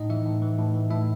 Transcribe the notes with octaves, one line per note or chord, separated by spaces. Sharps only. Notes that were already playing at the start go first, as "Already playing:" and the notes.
Already playing: A2 D#4 D#5
E3 E4 E5
A2
E3
A2
E3
A2 E4 E5